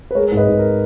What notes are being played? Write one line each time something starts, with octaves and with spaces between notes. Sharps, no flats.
B4
G#3 A#4 C#5
G#2
B4 D#5
G#2
A#4